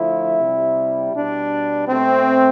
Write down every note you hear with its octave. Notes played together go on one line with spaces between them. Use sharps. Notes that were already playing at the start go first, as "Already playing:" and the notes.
Already playing: D3 F3 A3 E4
C3 G3
B2 G3 D4
B2 A3 C4